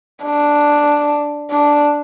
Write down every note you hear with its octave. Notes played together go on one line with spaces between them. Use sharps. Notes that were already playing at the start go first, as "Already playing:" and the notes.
D4
D4